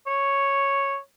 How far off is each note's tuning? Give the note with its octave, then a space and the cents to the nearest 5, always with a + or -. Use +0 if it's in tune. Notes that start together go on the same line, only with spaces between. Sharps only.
C#5 -5